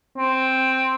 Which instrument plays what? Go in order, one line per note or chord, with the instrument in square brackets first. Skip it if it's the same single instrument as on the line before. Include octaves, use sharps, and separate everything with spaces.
[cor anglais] C4